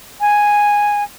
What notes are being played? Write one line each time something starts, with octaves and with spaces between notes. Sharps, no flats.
G#5